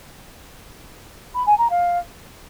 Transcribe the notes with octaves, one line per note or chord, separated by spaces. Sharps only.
B5
G#5
A#5
F5